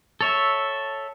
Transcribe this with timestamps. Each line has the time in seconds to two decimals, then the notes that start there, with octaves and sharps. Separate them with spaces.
0.21 A4 C#5 E5